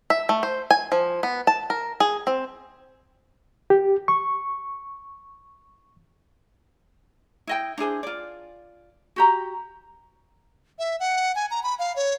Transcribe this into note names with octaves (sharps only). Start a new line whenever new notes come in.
E5
A3
C5
G#5
F3
B3
A5
A#4
G#4
C4
G4
C#6
E4 D#5 G5
D4 E4 G#4 C5
F4 D5
F#4 G4 A#5
E5
F#5
G#5
A#5
B5
F5
C#5